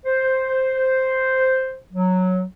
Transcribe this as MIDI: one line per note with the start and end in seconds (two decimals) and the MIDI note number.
0.06 1.79 72
1.93 2.44 54